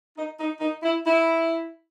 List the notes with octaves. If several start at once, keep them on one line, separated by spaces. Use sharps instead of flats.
D#4
D#4
D#4
E4
E4